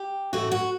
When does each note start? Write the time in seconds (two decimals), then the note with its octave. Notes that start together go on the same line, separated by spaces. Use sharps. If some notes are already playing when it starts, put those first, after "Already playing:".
Already playing: G4
0.33 A2 E3 A3 F#4
0.52 F#4